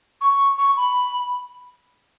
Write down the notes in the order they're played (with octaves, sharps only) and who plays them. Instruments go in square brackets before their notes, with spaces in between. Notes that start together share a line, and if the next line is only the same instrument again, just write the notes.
[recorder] C#6
C#6
B5